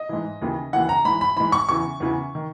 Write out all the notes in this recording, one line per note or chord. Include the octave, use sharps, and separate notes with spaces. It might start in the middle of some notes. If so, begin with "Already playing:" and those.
Already playing: D#5
G#2 E3
D#2 C#3 E3
D#2 C#3 E3 F#5
A#5
G#2 E3 B5
B5
G#2 E3 B5
C#6
E2 C#3 E3 C#6
E2 C#3 E3
D#3